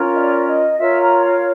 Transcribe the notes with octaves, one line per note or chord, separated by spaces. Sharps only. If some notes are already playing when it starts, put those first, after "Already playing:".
Already playing: C#4 F4 A#4
D#5
D5
D#5
F4 A#4 C#5 E5
A#5
F5